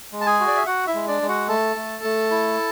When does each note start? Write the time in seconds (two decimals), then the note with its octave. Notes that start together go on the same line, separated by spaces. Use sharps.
0.12 G#3
0.21 A5
0.26 G#4 G#5
0.40 F#4
0.47 D5
0.57 E5
0.66 F#4 F#5
0.87 E4 E5
0.94 G#3
1.08 D4 D5
1.22 G#3
1.28 F#4 F#5
1.48 A3 A4 A5
1.76 A3
2.04 A3
2.31 E4